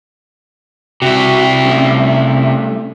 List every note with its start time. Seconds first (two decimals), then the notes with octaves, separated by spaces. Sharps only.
1.02 C3 E4 F#4
1.65 G3 A3 C#4